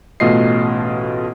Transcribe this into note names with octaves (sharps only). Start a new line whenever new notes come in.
A1 B2 A3 F4 D#5 C7